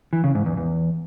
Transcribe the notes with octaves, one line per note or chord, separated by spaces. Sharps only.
E3
C#3
G#2
E2
E2